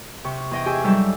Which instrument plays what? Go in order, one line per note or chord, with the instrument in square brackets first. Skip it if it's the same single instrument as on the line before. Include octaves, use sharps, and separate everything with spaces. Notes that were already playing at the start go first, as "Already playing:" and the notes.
[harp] C3 C#6
E2 D#5 G5
G4 G#4 G#5 E6
G#2 F#3 G3 A4 E6